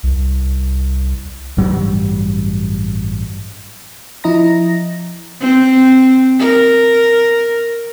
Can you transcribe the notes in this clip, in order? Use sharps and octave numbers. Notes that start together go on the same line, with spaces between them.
C2
A1 G2 F#3 G3
F3 E4 D#5 A#5 A#6
C4
A#4